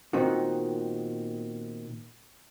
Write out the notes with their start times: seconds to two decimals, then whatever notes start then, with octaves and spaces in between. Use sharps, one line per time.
0.13 A#2 D#3 B3 C4 D#4 F#4